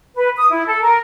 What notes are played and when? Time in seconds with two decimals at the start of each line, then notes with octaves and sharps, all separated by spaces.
0.16 B4
0.37 D#6
0.51 E4
0.67 A4
0.82 A#4